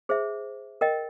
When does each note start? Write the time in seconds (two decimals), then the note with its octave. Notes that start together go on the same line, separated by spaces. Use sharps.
0.09 G#4 C5 E5
0.81 A#4 D#5 G5